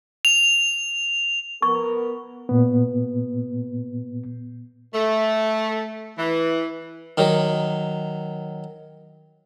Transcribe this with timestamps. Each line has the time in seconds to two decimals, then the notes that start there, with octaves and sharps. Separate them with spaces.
0.25 F7
1.62 B3 A#4 C#6
2.49 A#2 B3
4.94 A3
6.18 E3
7.18 D#3 F#3